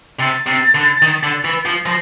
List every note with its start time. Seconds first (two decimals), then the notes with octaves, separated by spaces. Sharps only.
0.20 C3 A6
0.47 C3
0.75 D3
1.02 D#3
1.23 D3
1.45 E3
1.65 F3
1.85 F3 A#6